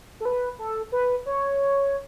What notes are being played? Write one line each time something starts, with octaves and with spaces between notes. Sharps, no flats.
A4
B4
A4
B4
C#5